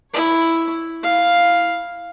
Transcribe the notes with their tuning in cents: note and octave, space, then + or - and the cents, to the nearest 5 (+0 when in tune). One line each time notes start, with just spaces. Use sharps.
E4 +0 C#5 +0
E4 -10 F5 +0